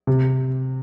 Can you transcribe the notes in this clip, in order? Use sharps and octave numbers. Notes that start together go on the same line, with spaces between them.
C3